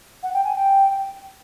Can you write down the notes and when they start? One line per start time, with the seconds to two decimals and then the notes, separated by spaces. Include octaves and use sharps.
0.23 F#5
0.34 G5
0.44 G#5
0.55 G5